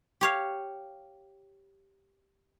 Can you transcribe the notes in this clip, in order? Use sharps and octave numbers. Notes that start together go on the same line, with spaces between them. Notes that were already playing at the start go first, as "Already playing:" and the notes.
G4 C#5 F5